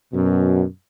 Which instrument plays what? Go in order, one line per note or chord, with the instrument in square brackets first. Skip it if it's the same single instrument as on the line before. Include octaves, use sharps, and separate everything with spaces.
[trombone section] F#2 B2